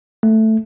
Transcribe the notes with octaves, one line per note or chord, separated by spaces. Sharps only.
A3